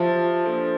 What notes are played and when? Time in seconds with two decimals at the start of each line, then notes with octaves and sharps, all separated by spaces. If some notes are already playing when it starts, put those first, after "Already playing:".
Already playing: F3 G4 C5 E5 A5
0.44 A#3 D4 A4 C5